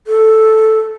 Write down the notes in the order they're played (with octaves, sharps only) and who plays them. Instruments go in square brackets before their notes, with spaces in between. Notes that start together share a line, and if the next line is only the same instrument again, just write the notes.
[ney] A4